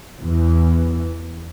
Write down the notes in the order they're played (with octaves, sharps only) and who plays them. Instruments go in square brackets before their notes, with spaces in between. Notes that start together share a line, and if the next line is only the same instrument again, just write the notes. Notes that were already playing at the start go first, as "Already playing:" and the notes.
[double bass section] E2 E3